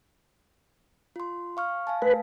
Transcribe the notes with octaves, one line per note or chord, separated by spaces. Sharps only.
F4 C6
F5 C#6 F6
F5 G#5 A5
A3 B4